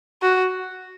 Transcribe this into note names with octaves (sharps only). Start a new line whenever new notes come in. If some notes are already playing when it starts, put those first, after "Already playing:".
F#4